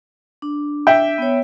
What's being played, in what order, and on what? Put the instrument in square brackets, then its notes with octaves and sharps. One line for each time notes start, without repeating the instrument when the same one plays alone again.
[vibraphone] D4
[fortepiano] E5 G5
[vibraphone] B3 C#5